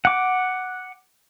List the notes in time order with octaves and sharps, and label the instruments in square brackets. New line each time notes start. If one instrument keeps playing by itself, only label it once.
[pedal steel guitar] F#5 D6